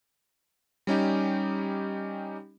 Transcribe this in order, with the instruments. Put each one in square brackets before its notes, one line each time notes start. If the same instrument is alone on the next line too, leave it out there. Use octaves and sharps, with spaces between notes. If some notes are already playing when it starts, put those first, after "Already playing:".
[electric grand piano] G3 C#4 D#4 G4